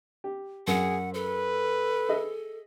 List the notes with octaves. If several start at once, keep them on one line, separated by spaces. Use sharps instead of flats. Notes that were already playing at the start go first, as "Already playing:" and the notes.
G4
F#2 G#4 F#5
A4 B4
G#4 D#5 E5